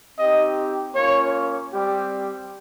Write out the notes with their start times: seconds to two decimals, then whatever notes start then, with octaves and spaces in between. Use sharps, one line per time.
0.18 C4 D#4 G4 D#5
0.95 A#3 C#4 F4 C#5
1.72 G3 C4 G4